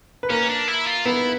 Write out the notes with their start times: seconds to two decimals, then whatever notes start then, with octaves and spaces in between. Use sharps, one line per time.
0.23 B4
0.30 A#3 C#4 A#4
0.50 D4
0.68 E4
0.87 F4
1.05 B3 E4 B4